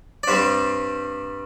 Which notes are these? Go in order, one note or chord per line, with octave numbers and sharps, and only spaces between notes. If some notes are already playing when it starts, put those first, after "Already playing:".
D5
G2 G3 C4 C5